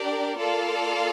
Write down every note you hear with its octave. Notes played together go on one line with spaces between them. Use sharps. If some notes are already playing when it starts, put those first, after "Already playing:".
Already playing: D4 G4 A#4 D5
A#3 F4 A4 D5 F5